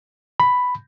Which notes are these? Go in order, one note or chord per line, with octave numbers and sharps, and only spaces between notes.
B5